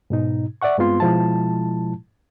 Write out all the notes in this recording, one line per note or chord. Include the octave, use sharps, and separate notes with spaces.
G#2 B2 D#4
D5 E5 F#5 C#6
G2 G#3 B3 C4 F4 C6
B2 F3 G#3 E4 A5